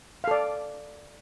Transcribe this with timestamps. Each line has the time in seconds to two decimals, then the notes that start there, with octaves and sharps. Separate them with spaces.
0.24 F5
0.28 A4
0.31 D5